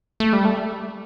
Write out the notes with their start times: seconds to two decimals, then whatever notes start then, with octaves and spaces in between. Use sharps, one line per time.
0.20 A3
0.33 G3
0.45 A3